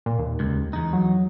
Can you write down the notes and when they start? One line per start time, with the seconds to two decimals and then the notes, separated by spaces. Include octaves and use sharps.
0.06 A#2
0.19 D#2
0.40 C#2
0.73 E2 D#4
0.93 F#3